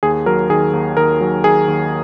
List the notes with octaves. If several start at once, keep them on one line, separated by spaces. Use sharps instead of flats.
D#2 G#4
F#3 A#4
D#3 G#4
D#2
D#2 A#4
F#3
D#3 G#4
D#2